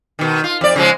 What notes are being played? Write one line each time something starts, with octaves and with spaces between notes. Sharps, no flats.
B2 D#3
F4
F2 D5
C#3 F3 G#3